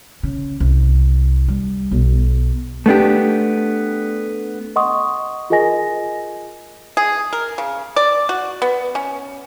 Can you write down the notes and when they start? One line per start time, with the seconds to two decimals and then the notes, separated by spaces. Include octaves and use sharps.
0.23 C#3
0.60 C2
1.48 G3
1.91 B1
2.86 A3 B3 D4 G4
4.76 D#5 F#5 C6 C#6 D#6
5.50 F4 G#4 A#4 D#5 G#5 A#6
6.97 G#4
7.33 A#4
7.58 C#3
7.96 D5
8.29 F#4
8.62 B3
8.95 C#4